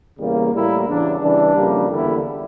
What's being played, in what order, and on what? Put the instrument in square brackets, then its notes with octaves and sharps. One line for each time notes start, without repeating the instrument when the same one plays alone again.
[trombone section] E2 C#3 G3 A#3
A2 G3 A#3 E4
E2 C#3 E3 D4
C#3 E3 G3 D4
F2 C#3 G3 A#3
E2 D3 G3 A#3 E4